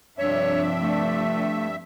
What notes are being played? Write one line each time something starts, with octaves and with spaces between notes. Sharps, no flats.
G2 C3 F3 D4 C#5 E5
A3